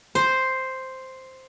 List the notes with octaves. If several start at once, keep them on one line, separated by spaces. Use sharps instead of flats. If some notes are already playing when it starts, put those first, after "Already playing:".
C5